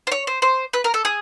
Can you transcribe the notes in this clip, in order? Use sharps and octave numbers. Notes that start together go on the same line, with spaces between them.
C5
C#5
C5
C5
B4
A#4
A4
G#4